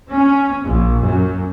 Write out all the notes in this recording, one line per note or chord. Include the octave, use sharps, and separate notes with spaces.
C#4
A#1
F#2